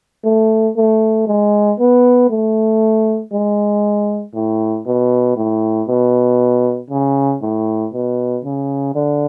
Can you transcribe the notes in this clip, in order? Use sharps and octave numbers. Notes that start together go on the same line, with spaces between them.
A3
A3
G#3
B3
A3
G#3
A2
B2
A2
B2
C#3
A2
B2
C#3
D3